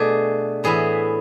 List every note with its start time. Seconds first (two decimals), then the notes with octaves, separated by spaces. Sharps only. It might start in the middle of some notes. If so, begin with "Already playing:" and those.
Already playing: B2 A3 D4 G#4
0.64 A2 E3 B3 E4 G#4